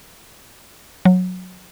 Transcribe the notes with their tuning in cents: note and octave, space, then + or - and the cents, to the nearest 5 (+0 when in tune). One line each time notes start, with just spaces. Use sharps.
F#3 -15